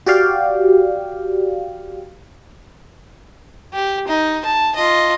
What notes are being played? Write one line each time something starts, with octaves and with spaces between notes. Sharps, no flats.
F#4 G4 D5 F5 G5
G4
D#4
A5
F4 D#5